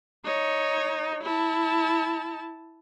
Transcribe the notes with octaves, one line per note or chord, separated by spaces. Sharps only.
D#4 C#5
E4 A5